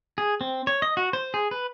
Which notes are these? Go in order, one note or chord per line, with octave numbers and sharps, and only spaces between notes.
G#4
C4
C#5
D#5
F#4
C5
G#4
B4